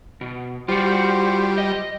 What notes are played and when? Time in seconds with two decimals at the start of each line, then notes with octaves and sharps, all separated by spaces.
0.21 B2
0.68 G3 F4 F#4 C5
1.58 D#5